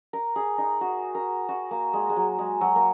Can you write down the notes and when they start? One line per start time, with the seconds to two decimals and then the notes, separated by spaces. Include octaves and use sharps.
0.13 A#4
0.36 G#4
0.58 D#4
0.81 F#4
1.15 A#4
1.49 F#4
1.71 A#3
1.93 G#3
2.10 G#3
2.16 F#3
2.39 G#3
2.61 F#3
2.76 A#3